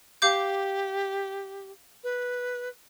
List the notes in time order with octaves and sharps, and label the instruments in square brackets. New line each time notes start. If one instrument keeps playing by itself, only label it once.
[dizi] G4 [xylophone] F5 D6 G6
[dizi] B4